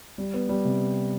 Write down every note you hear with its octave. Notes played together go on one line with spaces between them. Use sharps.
G3
B3
G3
C3